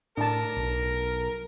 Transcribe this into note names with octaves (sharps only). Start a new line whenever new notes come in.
A2 D4 A#4 A5
B1